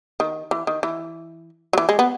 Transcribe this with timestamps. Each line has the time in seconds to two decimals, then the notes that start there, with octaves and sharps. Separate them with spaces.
0.20 D#3
0.51 E3
0.67 D#3
0.83 E3
1.73 F#3
1.78 E3
1.89 G#3
1.99 B3